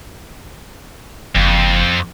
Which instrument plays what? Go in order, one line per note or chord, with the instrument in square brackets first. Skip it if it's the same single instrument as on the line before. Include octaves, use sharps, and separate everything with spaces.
[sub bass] F#1 [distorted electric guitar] F2